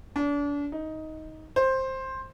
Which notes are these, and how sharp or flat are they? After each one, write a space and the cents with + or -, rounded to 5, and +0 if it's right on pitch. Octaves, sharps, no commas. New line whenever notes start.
D4 -35
D#4 +10
C5 +10